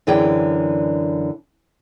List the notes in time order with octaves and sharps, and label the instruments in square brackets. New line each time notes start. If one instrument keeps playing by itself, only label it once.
[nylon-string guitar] F#2 D3 E3 G#4 D5 G5